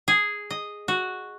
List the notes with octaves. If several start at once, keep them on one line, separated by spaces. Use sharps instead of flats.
G#4
D#5
F#4